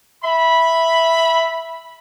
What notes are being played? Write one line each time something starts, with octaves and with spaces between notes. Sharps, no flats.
E5 B5